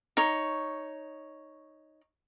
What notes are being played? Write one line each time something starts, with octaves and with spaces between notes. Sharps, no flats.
D#4 C#5